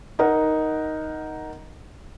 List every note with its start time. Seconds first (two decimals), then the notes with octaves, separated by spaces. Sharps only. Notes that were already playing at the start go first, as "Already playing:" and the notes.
0.19 D#4 A#4 F#5